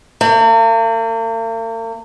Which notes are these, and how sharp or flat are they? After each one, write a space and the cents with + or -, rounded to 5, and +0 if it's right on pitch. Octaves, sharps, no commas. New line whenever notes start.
A#3 -45